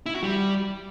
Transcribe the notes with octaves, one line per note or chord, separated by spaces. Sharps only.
E4
F#4
G3